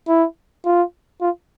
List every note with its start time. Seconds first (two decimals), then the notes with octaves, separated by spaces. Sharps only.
0.08 E4
0.66 F4
1.21 F4